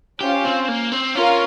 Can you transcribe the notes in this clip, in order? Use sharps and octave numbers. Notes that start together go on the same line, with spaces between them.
C#4 F4 G4 C5
C4
A#3
C4
C#4 F4 A#4